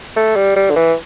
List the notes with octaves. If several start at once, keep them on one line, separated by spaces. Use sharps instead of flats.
A3
G3
G3
D3
E3